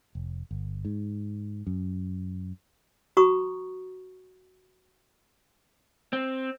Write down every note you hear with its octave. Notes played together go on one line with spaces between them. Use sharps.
F1
G1
G#2
F#2
F#4 A#5 C#6 D#6
C4